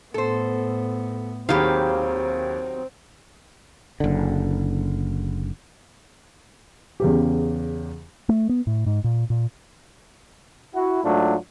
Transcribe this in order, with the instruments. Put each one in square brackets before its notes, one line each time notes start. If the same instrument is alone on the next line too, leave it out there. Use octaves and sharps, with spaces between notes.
[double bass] A2 B3 [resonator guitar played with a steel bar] A4 C5
[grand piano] D#2 G#4 B5 [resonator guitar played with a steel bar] D#3 F#3 [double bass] C4 [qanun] G4 F5
[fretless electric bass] F#1 D3
[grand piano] E2 C#3 G4
[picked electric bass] A3
B3
A2
G#2
A#2
A#2
[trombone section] E4 F#4
G#2 F#3 A3 D4 F4